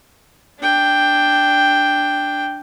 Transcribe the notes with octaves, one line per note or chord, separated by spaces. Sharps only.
D4 G5